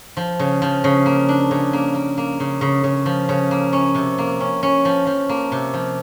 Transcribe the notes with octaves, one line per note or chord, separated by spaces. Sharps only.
F3
C#3
F3
C#3
A#3
D4
C#3
A#3
A#3
A#3
C#3
C#3
C#3
F3
C#3
A#3
C#4
C3
A#3
C#4
C#4
F3
F3
A#3
C3
F3